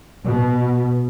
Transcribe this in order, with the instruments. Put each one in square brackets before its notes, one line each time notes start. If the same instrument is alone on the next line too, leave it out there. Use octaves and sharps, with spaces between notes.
[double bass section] B2